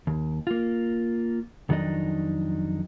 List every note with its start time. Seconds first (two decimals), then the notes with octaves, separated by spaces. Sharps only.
0.07 D#2
0.47 A#3 F4
1.69 F2 D#3 F#3 D4 D#4 D#5